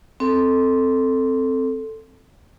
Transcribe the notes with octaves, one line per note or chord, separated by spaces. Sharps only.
C4 A4